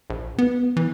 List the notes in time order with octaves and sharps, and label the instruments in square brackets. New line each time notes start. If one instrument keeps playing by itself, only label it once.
[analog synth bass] A#1
B3
E3